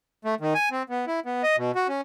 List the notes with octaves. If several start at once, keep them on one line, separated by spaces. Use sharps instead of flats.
A3
D#3
G#5
C4
B3
E4
B3
D#5
B2
F#4
C#4